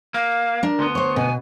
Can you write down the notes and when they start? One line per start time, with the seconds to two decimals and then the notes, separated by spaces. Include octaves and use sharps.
0.14 A#3 F5
0.63 D4 A#4
0.79 D2 B3 C6
0.95 C5 C#5
1.16 B2 G#5